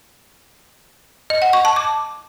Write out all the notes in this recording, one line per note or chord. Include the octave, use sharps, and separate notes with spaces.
D#5
F#5
C#6
A5
D6